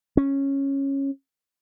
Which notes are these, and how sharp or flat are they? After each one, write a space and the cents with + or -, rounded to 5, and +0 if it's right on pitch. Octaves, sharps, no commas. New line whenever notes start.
C#4 -10